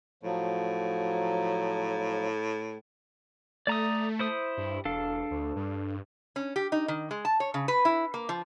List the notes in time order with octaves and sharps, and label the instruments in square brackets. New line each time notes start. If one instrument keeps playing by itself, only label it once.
[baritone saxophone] A2 [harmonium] F3 F#3
[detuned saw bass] A3 [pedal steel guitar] D5 A#5 D#6
[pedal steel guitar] E4 C5 D#6
[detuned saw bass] G2
[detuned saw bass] E1 [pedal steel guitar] D4 A4 F5
[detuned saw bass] D2
G2
[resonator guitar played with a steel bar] C#4
G4
D#4
D#3
G#3
A5
C#5
C#3
B4
E4
A#3
F3